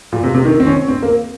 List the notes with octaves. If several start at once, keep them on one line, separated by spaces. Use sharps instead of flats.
A#2
C3
C3
D#3
C4
C#4
C4
A#3